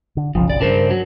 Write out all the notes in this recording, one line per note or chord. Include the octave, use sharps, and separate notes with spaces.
D3
F#1 B1 C#3 F3
D5
G2 C#3 D4 A#4 C5
F#3